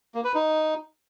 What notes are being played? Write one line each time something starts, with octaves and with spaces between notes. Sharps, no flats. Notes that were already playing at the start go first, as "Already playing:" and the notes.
A#3
B4
D#4